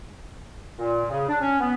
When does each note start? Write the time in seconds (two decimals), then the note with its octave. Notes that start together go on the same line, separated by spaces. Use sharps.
0.79 A#2
1.10 C#3
1.29 D4
1.41 C#4
1.60 B3